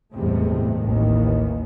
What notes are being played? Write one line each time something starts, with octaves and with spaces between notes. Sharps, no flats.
G1 E2 A2 C3 G#3 A3
A1 D#2 D#3 E3